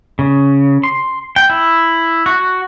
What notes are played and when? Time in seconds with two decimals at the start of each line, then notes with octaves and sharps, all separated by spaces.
0.19 C#3
0.83 C6
1.36 G5
1.50 E4
2.26 F#4